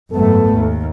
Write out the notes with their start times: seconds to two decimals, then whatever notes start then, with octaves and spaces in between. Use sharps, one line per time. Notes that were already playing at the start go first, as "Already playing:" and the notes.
0.12 G#1 F#2 A3 B3 A4
0.52 D#2